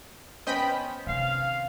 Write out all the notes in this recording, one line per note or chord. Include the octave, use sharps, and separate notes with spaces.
B3 C#4 C5 D#5 G5 B5
C3 D#3 F5